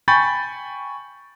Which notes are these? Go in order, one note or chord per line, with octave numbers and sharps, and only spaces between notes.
G5 G#5 B5 C#6 G6 A6